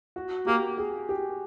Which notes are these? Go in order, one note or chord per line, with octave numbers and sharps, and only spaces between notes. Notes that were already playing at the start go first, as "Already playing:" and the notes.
F#4
A#3 G4
G#4
G4